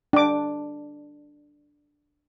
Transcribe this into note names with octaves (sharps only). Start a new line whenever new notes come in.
D4 D6